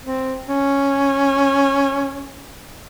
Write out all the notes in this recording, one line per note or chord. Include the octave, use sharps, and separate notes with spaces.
C4
C#4